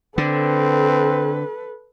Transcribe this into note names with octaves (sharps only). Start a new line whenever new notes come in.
D3 C4 A4 B4